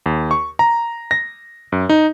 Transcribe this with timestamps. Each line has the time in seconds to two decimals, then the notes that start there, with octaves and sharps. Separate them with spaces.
0.06 D#2
0.31 C#6
0.59 A#5
1.11 A#6
1.72 F#2
1.89 D#4